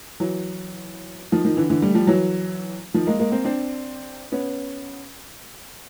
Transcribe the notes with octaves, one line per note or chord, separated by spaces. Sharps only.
E3 F#3
D#3 F3
D#3 F3
D3 E3
D3 E3
G3 A3
F3 G3
E3 F#3
D#3 F3
G#3 A#3
G#3 A#3
A#3 C4
C4 D4
B3 C#4